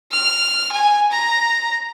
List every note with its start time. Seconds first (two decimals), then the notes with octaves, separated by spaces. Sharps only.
0.12 F6
0.72 G#5
1.11 A#5